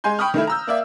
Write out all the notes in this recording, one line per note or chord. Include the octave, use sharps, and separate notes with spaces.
G#3 G#5 C6 G6
G5 B5 C#6 D#6 F6
D#3 A3 E4
A#5 E6 G6
A#3 D5 E5